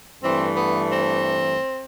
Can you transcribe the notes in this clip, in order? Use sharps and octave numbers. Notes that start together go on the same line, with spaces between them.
G2 E3 A3 C4
B3
C4